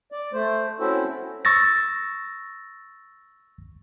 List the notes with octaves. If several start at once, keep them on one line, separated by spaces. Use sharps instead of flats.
D5
A3 C5
C4 C#4 E4 F#4 A4 C5
C#6 E6 A6 A#6